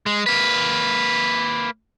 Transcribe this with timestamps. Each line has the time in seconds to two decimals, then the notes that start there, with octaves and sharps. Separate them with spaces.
0.06 G#3
0.26 A#3 B4